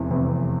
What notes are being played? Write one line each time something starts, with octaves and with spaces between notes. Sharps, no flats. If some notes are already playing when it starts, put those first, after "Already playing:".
Already playing: F1 E2 C3 E3
F1 E2 C3 E3